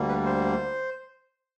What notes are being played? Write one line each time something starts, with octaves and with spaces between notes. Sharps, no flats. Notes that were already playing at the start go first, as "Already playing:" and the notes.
Already playing: D2 D3 G3 A#3
B4
C5